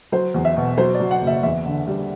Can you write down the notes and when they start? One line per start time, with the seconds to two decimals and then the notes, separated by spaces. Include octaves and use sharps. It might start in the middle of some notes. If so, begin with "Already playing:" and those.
0.12 F#3 C5
0.34 E2
0.45 E5
0.57 B2
0.78 F#3 C5
0.95 D5
1.00 F#3
1.11 F#5
1.22 F#1
1.27 E5
1.43 E2 E5
1.66 D3
1.88 G3